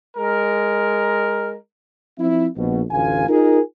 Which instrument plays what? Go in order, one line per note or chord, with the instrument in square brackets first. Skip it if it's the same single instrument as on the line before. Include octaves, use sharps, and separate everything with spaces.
[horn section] G#3 A#4
[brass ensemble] F3 C4 E4
A#1 B2
A1 D2 F4 G#5
D#4 F4 G#4 A#4